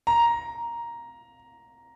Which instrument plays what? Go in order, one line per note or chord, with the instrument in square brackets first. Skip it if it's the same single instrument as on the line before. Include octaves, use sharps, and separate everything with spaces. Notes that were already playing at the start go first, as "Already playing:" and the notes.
[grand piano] A#5